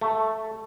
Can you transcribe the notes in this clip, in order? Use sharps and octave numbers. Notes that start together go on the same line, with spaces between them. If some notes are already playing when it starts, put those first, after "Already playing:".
A3